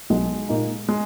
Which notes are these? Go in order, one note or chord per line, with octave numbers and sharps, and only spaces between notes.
B1 G#3
A#2 A#3 D#4
G#3